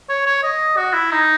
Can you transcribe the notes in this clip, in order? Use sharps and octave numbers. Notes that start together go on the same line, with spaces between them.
C#5
C#5
D#5
F#4
E4
D#4